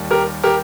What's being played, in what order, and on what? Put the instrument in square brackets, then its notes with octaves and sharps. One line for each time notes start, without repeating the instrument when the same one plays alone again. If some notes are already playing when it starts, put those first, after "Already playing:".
Already playing: [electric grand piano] D#2 G3
[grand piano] G4 A#4
G4 A#4